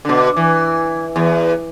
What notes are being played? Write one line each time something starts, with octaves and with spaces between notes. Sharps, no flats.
B2 D3
E3
E2